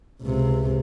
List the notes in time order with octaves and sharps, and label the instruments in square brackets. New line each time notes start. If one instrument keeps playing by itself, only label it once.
[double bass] C#2 C3